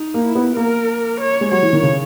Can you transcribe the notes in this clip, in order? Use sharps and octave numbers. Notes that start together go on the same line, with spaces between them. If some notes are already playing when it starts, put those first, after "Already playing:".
Already playing: D#4
A#3
E4
B3
A#3 A#4
C#5
G#3
F#3 C#5
E3
D#3
C#3